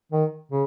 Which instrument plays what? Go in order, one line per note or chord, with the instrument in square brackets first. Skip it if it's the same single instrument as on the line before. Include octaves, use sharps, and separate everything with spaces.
[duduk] D#3
C#3